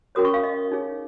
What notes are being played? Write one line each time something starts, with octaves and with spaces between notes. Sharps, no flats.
C#4 F#4 A#4 C#5 D#6
C#6
F5
D#5
D#4 G#4 C#5